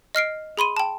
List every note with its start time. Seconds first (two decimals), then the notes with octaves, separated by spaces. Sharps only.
0.15 D#5 F6 C7 D7
0.57 G#4 B5 C6 D#7
0.77 G5 A5